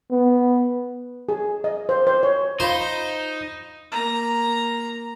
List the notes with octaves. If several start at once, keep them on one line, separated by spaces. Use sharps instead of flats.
B3
G#4
D#5
C5
C5
C#5
D#4 F4 C5 F5 B5
A#3 A#5